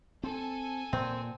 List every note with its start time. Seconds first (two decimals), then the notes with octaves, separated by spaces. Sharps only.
0.24 C4 A4 G#5
0.93 A#2 C4